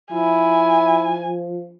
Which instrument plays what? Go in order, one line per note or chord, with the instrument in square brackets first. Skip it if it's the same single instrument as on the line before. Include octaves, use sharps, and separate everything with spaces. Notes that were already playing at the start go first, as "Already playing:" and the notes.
[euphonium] F3 [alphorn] E4 [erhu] G#5